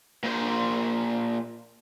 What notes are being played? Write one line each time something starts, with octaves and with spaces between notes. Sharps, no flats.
A#2 C5